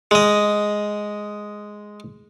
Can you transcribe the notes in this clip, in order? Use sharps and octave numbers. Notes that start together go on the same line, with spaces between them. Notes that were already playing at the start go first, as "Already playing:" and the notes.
G#3 D#5